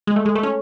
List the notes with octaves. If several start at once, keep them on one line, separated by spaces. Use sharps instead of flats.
G#3
A3
G#3
A3
C#4